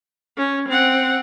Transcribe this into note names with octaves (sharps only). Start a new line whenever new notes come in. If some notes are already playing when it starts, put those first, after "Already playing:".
C#4
C4 F#5